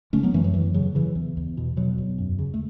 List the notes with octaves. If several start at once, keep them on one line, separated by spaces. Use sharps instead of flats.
C#3 A3 C#4
F#3 B3
F#2 E3 A3
F#3
E2 E3
C#3 F#3
C#3 E3
E2
E2
B2
B2 F#3
E2
F#2
C#3
A3